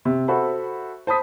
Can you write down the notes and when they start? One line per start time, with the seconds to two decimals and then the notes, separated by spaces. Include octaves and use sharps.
0.05 C3
0.28 F#4 A4 C5 E5 B5
1.07 C5 A5 B5 D#6 B6